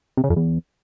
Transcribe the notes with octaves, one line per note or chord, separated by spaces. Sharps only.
C3
C#3
F2
E2